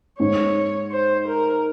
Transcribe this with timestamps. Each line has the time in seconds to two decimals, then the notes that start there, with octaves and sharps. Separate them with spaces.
0.20 G#2 C#5
0.92 C5
1.28 A#4